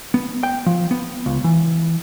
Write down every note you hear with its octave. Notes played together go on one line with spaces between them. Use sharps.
B3
G5
F3
B3
C#2
E3